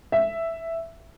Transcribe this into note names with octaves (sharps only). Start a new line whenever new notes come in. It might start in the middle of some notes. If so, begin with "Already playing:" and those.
E5